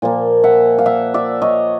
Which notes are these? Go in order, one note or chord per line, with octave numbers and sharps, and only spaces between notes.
A#2 F3 A#3
E5 F#5
F5
E5 F#5
D5 E5
C#5 D#5